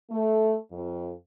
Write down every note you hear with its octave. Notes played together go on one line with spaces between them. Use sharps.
A3
F2